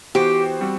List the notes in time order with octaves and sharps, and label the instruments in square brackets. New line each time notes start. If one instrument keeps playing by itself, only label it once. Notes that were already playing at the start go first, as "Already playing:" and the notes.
[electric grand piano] E3 B3 F#4 C5 [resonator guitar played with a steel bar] G4
[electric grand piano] G3 C4 F#4